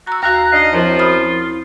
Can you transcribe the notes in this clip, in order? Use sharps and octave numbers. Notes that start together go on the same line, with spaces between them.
F#4 A#5 E6
D#2 F#4 F5 A#5 F#6
D4 D#4 D#5 F5
F#2 F3 C4 E4 F4 C#5
B5 D#6 F6